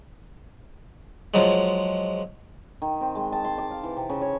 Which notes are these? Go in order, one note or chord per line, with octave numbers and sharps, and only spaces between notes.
F3 F#3 G#3
D#3
C4
G#3
A5
C6
D6
F5
E3
C3
C#3
C#5